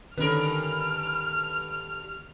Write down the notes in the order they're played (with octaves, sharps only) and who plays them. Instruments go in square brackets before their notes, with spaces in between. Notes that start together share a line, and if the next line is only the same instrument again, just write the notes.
[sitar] G2 A#4 [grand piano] D3 B4 [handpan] D#3 C#4 D4 [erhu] F6